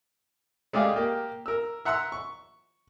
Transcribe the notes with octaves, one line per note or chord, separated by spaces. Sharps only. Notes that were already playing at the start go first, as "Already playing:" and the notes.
G#3 A3 G4 D5 F5
A#3 G4
A#4 E6
E5 F#5 A#5 C6 E6
C#6